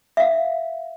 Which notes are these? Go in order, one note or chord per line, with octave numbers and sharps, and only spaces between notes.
E5 F5